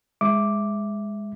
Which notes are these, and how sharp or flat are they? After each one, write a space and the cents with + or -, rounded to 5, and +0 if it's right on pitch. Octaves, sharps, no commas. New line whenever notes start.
G#3 -10 E5 +0 D6 +0